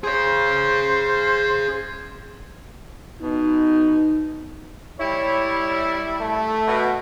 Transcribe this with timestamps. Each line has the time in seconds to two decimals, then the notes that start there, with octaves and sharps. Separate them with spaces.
0.04 G#4 C5 C#5
3.22 B2 D#4
4.99 G3 E4 C#5
6.21 A3
6.68 B2